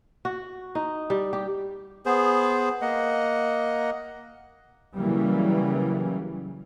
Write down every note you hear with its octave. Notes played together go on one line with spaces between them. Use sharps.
F#4
D#4
G3
G4
B3 G#4 C5
A#3 D#5 F#5
C#3 E3 F#3 G3 A#3